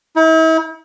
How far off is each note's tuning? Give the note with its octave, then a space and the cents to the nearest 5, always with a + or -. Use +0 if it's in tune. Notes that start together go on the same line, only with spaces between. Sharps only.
E4 -40